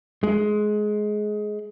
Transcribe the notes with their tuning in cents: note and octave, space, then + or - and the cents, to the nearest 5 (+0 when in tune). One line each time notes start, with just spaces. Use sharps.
G#3 +20